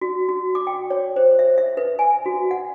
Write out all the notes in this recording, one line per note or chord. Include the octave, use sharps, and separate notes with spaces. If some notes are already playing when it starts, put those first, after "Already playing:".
F#4
F#4
D6
G5
C#5
C5
E5
E5
B4
G#5
F#4
F#5